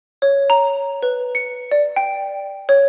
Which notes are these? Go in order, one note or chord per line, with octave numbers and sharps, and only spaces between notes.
C#5
A#5
B4
C#7
D5
G5
C#5